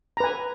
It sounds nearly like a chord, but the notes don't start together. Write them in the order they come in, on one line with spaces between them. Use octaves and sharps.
A#5 B4 G#5